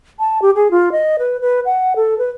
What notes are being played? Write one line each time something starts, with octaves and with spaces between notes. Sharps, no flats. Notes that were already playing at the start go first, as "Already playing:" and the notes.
A5
G4
G#4
F4
D#5
B4
B4
F#5
A4
B4